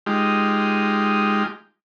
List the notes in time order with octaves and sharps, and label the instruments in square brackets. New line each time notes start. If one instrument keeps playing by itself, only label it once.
[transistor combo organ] G#3 D#4 F4 G4